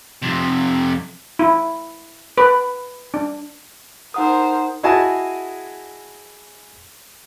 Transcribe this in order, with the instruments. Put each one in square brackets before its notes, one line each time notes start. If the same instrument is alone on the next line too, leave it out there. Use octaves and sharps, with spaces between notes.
[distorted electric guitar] F2 C3
[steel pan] E4
B4
D4
[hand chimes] D#4 F#5 D#6 [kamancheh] A#4 C5
[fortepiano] E4 F#4 G#4 D#5 G#5 A5